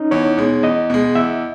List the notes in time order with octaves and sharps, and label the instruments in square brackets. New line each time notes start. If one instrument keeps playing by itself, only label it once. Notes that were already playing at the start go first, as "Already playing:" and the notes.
Already playing: [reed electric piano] C#4 D#4
[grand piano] E2 [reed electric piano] C#5
[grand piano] B2 G#3
[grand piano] E2 [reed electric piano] D#5
[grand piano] B2 G#3
[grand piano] E2 [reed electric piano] E5